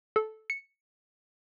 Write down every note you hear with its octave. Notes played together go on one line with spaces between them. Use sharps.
A4
C#7